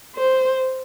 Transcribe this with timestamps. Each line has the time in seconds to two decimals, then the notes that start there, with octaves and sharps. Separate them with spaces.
0.15 C5